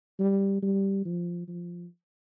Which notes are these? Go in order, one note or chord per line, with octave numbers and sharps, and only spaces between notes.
G3
G3
F3
F3